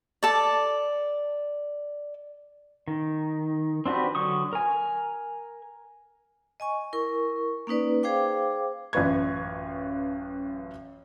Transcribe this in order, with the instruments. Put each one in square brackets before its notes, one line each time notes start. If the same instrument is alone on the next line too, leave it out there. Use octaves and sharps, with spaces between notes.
[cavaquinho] A4 D5
[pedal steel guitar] D#3
C4 D4 F#4 G4 B4
D3 F#3 C#6 D#6
A#4 G#5
[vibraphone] D#5 G#5 C#6
E4 A#4 C#6
A#3 C#4 D#4 B4 D5
G#4 C5 F5 G5 D6
[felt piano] A1 F#2 F4 B4 C#6 G#6